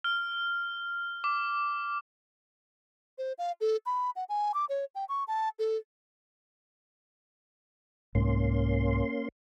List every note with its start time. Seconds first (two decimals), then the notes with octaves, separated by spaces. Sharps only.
0.04 F6
1.24 D6
3.18 C5
3.39 F5
3.61 A4
3.86 B5
4.16 F#5
4.29 G#5
4.54 D6
4.69 C#5
4.95 G5
5.09 C#6
5.28 A5
5.59 A4
8.15 C2 G#2 A#3 C#4 C6